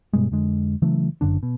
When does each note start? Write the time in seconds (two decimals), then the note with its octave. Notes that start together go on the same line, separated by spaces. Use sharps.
0.13 G2 B2 G3 G#3
0.31 F2 D3 G#3
0.82 C#3 E3 F#3 A3
1.21 F#1 F#2 D3 D4
1.43 B2